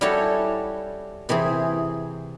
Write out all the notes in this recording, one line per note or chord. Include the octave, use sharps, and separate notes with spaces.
G3 C#4 E4 F#4 A4 C#5
C3 E3 C4 G#4